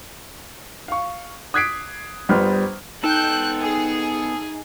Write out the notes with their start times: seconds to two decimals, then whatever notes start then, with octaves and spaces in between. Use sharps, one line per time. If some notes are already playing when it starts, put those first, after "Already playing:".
0.88 F5 C#6
1.54 D#6 F#6 G#6 B6 C7 D7
2.29 G1 G3 B3 C5 F6
3.04 B3 D#4 A4 G5 F#6 G6
3.61 G#4